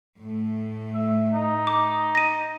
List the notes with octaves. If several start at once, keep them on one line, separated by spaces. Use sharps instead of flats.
A2 A3
E5
D#4
D6
A#6 D#7